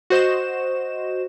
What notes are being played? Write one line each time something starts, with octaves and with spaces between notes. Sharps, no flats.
F#4 C5 D#5 E7